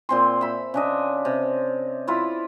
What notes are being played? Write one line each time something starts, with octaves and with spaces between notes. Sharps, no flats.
A#2 C4 C6
E5 B5
C#3 D4 D#5
C3
E4 F4 B5